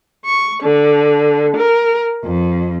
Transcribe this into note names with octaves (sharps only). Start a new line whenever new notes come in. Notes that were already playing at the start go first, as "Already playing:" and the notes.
C#6
D3
A#4
F2